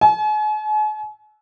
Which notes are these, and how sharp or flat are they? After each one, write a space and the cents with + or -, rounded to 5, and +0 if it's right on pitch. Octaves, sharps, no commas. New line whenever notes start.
G#5 +45